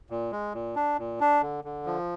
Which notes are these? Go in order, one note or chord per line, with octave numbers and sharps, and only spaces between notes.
A#2
G#3
A#2
D4
A#2
D4
D3
D3
F3